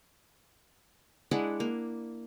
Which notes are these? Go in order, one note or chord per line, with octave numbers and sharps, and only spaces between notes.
G#3 D4 E4 F#5
A#3